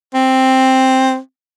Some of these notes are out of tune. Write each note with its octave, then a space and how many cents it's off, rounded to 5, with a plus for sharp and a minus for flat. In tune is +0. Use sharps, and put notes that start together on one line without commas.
C4 +5